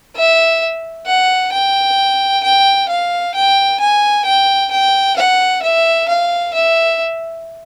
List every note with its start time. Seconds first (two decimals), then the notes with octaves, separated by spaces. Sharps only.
0.16 E5
1.07 F#5
1.52 G5
2.44 G5
2.89 F5
3.35 G5
3.80 G#5
4.25 G5
4.71 G5
5.16 F#5
5.62 E5
6.08 F5
6.54 E5